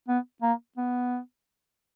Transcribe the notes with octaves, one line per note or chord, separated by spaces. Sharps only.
B3
A#3
B3